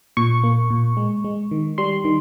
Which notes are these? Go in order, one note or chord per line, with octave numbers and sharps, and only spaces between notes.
A#2 C#6
A#3
A#2
G#3
G#3
D#3
G3 C6
D#3